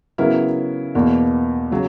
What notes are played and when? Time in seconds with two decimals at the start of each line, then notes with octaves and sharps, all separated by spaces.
0.18 C#3 F#3 B3 E4 A#4
0.95 E2 B2 A#3
1.71 C#3 F#3